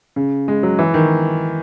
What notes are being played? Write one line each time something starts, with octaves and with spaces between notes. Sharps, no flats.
C#3
G#3
F#3
E3
D#3